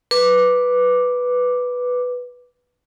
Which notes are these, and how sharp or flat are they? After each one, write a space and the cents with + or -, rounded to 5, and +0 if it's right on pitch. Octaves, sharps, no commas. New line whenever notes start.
B4 +0 D6 +0